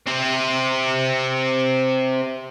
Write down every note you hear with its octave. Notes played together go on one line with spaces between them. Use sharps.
C3 C4